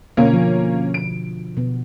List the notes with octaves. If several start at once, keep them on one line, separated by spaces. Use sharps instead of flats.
B2 D3 A#3 C#4 F4
F3
D7
B2 B3